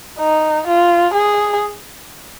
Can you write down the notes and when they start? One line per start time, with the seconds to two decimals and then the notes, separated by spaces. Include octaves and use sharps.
0.19 D#4
0.67 F4
1.14 G#4